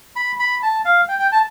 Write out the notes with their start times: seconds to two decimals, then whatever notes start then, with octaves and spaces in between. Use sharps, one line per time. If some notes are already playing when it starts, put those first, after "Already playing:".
0.16 B5
0.39 B5
0.63 A5
0.85 F5
1.09 G5
1.19 G5
1.32 A5